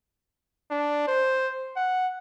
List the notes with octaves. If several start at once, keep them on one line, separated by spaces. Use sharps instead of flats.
D4
C5
F#5